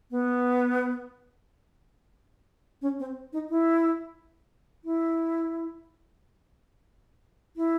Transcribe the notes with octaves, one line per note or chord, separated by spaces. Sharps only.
B3
C#4
C4
D#4
E4
E4
E4